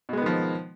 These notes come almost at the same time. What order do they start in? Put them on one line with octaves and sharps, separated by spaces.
B2 G#3 B3 D#3 F3